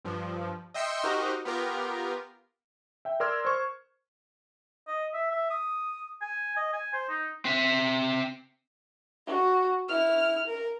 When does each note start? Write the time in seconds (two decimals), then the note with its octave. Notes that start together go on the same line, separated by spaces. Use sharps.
0.05 G2 F3
0.74 D#5 E5 G5 C6 E6 C#7
1.04 D#4 F#4 G4 A#4 C5 D#5
1.45 B3 F4 G4 A#4
3.05 E5 G5
3.20 A#4 D5 C6 E6 F6 G#6
3.45 C5 C#6
4.87 D#5
5.14 E5
5.31 E5
5.50 D#6
6.21 G#5
6.57 D#5
6.73 G#5
6.94 C5
7.09 D#4
7.45 C4 E5
9.27 F#4
9.89 E4 F6
10.47 A#4